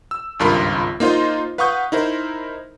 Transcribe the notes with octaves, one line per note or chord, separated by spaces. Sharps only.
E6
G#1 C#2 G2 F4 A#4 B5
A#3 D#4 F4 C5 D#5
B4 F5 F#5 C#6 D#6 G6
D#4 E4 A#4 C5